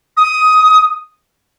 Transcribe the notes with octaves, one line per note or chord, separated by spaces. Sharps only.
D#6